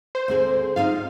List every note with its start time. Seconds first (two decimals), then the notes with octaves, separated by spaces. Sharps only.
0.15 C5
0.28 D2 C4 G#4
0.76 C4 D#4 F4 F5